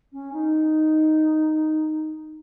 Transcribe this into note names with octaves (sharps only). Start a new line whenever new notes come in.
C#4
D#4